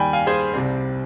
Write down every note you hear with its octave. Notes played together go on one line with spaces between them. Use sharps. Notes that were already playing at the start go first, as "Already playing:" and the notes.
Already playing: D#2 D#3 G3 G5 G#5 B5
F5 G#5
G#4 C5
C2 C3 G3 C4